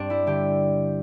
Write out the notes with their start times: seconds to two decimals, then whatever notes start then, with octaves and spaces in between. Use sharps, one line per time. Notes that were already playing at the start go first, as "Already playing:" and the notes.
Already playing: G2 C4 D4 G4
0.10 G3 E4
0.27 D3 G4